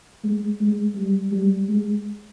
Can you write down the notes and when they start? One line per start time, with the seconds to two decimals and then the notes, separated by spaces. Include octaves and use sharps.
0.24 G#3
0.60 G#3
0.95 G3
1.31 G3
1.68 G#3